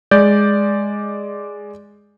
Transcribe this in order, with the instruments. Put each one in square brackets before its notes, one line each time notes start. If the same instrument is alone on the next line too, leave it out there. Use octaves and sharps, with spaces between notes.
[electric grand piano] G#3 D5 G6